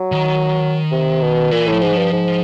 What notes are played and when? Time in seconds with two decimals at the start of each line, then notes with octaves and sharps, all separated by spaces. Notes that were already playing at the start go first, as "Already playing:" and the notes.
Already playing: F#3
0.12 D#3
0.92 C3
1.22 B2
1.51 A#2 E3
1.67 A2 F3
1.82 G#2 E3
1.92 G2 F3
2.12 G#2